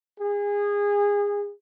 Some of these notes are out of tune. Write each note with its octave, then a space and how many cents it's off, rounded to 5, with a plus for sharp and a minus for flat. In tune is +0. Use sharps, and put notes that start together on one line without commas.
G#4 -25